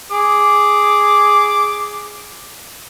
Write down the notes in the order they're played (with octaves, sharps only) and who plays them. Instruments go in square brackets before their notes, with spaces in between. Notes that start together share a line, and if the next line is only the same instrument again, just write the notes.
[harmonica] G#4 D6